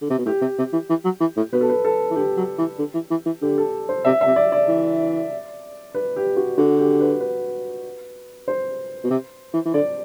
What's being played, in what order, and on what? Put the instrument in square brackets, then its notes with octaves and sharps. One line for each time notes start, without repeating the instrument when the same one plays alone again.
[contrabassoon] D3
C3
B2
[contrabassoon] A2 [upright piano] G4
[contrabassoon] C3
C3
E3
E3
F#3
E3
A2
[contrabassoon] B2 [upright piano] B4
[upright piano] A4
B4
A4
[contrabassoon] E3
[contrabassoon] D3 [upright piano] G4
[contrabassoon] F#3
E3
D3
E3
E3
E3
[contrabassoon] D3 [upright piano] G4
[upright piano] A4
C5
[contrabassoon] C3 [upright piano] E5
[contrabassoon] C3 [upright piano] E5
[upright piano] D5
D5
[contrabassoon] E3
[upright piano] B4
G4
F#4
[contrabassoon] D3 [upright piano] F#4
[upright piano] G4
B4
B4
C5
[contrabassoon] B2
C3
E3
E3
[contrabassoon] D3 [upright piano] D5